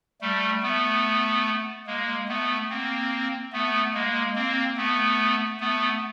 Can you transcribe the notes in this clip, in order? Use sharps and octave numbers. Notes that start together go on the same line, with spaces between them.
G3 A3
A3 B3
G#3 A#3
A3 B3
A#3 C4
A3 B3
G#3 A#3
A#3 C4
A3 B3
A3 B3